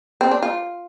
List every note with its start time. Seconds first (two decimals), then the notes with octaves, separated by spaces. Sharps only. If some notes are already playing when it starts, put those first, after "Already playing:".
0.21 C4
0.31 D4
0.43 F4